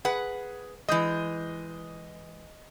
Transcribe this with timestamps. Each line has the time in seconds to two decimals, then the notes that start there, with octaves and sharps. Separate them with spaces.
0.05 G#4 B4 F#5
0.88 E3 G#3 D#5 D#6 G6